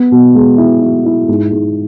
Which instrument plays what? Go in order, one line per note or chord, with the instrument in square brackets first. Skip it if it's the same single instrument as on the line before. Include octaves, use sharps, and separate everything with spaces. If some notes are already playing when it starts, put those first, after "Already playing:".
Already playing: [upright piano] B3
B2
G#3
E4
E4
E4
G#2
G#2